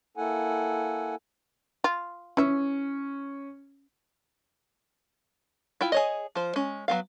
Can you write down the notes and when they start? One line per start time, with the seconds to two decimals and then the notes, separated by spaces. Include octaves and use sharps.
0.17 A#3 E4 A4 F#5 G#5
1.84 F4
2.37 E3 C#4 E5
5.81 E4 F4 G5
5.92 G#4 C#5 D#5
6.35 F3 C5
6.56 G#3 C#4
6.88 F#3 B3 F5